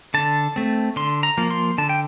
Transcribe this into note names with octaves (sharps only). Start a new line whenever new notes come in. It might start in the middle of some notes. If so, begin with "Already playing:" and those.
D3 A5
A3 C4
D3 C6
A#5
F3 A#3
C6
D3 A5
G5